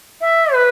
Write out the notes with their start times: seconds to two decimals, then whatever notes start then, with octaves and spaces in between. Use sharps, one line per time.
0.21 E5
0.54 B4